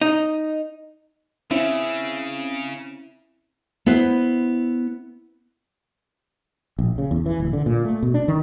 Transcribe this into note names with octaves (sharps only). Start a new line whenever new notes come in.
D#4
C#3 C4 C#4 E4
B3 E4 B4 C5
A#1
C#3
E2
E3
D1
D3
A#2
A3
B2
D4
D#3